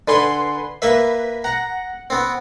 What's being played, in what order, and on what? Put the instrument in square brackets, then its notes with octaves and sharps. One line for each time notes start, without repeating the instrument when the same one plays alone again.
[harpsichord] D3 [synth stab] B4 G#5 C6
[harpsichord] A#3 E5 [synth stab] B4 B6
[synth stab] F#5 [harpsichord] A#5
[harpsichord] B3 C4